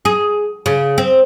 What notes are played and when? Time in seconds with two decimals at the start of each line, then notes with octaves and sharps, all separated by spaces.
0.05 G#4
0.66 C#3
0.98 C4